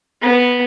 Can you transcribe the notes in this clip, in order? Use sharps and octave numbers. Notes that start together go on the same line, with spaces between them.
B3